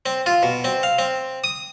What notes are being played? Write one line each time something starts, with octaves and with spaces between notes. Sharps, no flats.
C4
F4
B2
C4
F5
C4
D#6